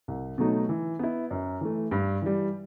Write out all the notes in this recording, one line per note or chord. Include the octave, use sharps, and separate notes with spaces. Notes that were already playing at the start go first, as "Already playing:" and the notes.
C2
B2 F#3 A3 D#4
E3
B3 E4
F#2
E3 A3
G2
E3 G3